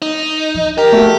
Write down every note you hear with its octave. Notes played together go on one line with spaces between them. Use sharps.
D#4
F3
G4 A#4
A3 F#4